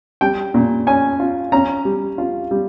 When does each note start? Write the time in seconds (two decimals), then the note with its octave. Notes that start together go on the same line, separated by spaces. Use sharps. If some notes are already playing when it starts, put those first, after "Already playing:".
0.21 G3 G5
0.54 A#2
0.87 C#4 G#5
1.20 F4
1.52 C#4 A#5
1.85 G3
2.18 F4
2.51 G3